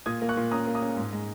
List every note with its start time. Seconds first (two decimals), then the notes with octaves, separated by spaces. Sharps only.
0.06 A#2 D#6 G#6
0.22 A#3
0.29 C#6 F#6
0.37 A#2
0.51 C#4 A#5 D#6
0.67 A#3
0.75 A#5 D#6
0.82 C#4
0.97 G#2
1.13 G#3